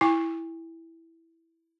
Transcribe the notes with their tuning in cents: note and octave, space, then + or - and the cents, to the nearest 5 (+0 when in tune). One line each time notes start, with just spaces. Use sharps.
E4 +0 G#5 -40 D6 +0